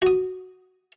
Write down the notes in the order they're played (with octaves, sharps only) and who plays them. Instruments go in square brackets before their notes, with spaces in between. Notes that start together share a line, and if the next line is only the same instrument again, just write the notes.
[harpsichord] F#4 D#6